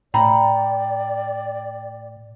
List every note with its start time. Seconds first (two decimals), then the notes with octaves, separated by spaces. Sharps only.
0.14 A2 D5 G5 A#5 B5